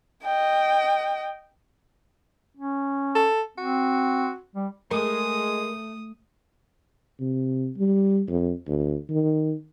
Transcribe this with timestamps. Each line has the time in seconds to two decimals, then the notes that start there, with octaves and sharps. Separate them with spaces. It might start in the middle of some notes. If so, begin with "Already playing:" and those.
0.24 D#5 G5
2.57 C#4
3.15 A4
3.58 C4 F#4
4.55 G3
4.91 G#3 A3 A#4 D#6
7.20 C3
7.78 G3
8.28 F2
8.68 D2
9.10 D#3